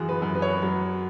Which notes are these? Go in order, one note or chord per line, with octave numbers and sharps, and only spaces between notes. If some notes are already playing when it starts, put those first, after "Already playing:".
Already playing: F#2 E3 F#4 G#4
B4
F#2
B4
C#5
B4
F#3